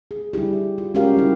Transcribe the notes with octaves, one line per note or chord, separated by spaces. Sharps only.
G#4
G3 D4 E4 G4
E4
F4
G#3 C#4 F#4 G4 A#4 F5
G3 E4